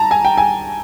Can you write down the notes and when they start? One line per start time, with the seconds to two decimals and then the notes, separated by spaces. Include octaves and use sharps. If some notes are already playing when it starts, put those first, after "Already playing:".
Already playing: A5 A#5
0.11 G#5
0.25 G5
0.38 G#5